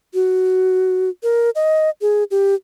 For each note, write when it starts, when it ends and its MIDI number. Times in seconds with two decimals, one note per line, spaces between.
0.14 1.09 66
1.23 1.50 70
1.55 1.90 75
2.01 2.24 68
2.31 2.55 67